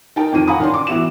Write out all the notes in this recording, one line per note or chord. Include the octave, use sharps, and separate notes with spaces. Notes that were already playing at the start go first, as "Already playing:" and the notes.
D#4 A#4 G5 A5
F2 D#3 D#7
F5 F#5 G#5 A#5 B5 D#6
D#3 C#4 D4 C6
D6
E3 B3 E4 F#4 E7